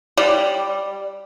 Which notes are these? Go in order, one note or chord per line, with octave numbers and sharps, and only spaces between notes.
G3